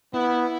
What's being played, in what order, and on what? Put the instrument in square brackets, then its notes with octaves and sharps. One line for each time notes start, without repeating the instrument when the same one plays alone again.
[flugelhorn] B3 [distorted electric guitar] E4